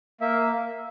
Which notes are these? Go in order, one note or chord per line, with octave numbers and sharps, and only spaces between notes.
A#3 E5